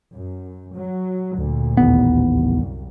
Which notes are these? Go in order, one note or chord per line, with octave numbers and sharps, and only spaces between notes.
F#2
F#3
D2 A#2
A1 D#2 B3
C2 F#2